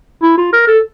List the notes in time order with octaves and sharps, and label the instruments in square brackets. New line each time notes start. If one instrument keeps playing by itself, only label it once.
[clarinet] E4
F4
A#4
A4